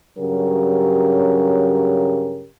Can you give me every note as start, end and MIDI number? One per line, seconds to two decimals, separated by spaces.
0.18 2.48 43
0.18 2.48 49
0.18 2.48 54
0.18 2.48 61
0.18 2.48 67
0.18 2.48 70